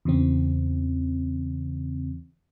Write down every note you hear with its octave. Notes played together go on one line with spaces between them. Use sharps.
E2 C#3 E3 C4